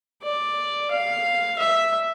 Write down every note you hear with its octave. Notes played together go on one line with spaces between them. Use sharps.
D5
F5
E5